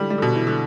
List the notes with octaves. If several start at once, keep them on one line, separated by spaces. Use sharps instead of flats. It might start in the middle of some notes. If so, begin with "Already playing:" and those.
Already playing: D3 E3 G3
G3
D3
B2
E3
D3